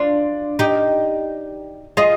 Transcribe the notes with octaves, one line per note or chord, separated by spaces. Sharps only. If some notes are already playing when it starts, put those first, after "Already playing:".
Already playing: D4 F4 D5
D#4 G4
F4 G#4 D#5